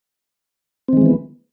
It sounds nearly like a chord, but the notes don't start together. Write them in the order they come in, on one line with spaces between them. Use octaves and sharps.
C4 D#3 G#3 E3 B3